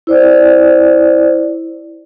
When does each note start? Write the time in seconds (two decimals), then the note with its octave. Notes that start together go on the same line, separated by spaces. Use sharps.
0.07 E4 C5 D5